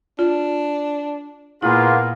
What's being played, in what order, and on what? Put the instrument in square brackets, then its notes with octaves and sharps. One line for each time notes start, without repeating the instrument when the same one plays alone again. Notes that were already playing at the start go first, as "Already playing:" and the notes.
[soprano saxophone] D4 [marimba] F4
[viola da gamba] A#2 [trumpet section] A#3 B3 F4 [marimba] E4 [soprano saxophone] G#4